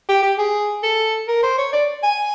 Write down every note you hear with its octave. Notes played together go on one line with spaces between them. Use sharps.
G4
G4
G#4
A4
A#4
C5
C#5
D5
G#5